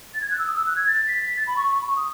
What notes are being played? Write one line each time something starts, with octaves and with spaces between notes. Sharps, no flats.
A6
G#6
F#6
E6
D#6
E6
F#6
G#6
A6
B6
B6
A6
B5
C#6
C#6
B5
C#6
D#6